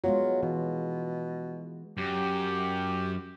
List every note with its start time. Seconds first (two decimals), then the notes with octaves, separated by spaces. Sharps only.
0.04 F#3 G#3 B3 F4
0.43 B2 E3
1.98 F#2 G4